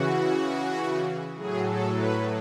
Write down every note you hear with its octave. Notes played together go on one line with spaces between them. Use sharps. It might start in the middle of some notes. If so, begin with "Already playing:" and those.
Already playing: C#3 E3 F#4
A2 F#3 G#4
A4
B4